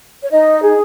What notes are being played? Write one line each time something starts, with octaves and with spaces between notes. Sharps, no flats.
C#5
D#4 D#5
G#4